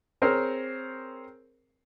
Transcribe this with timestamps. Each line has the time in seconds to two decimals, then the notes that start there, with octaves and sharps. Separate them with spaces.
0.22 C4 G#4 A#4 C5 C#5